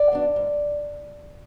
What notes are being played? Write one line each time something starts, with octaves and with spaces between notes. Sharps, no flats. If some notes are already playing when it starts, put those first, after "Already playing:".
Already playing: D5
F#3 B3 D4
G#2